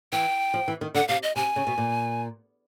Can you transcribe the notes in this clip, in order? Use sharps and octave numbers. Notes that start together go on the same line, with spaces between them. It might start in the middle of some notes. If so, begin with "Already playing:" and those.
E3 G5
F3
E3
D#3
D3 F#5
C3 F5
D#5
C3 G#5
C#3
B2
A#2